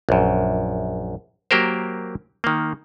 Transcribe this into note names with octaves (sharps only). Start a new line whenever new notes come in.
A#1 F#2
F#3 A#3 G4 A#4 C5
D#3 A#3